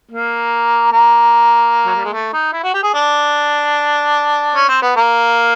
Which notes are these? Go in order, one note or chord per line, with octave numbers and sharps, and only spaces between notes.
A#3
A#3
F#3
G3
G#3
A3
D#4
E4
F#4
G4
G#4
D4
C#4
C4
B3
A#3